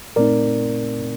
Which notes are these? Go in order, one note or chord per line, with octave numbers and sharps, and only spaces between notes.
A#2 A3 C4 D#4 A#4 D5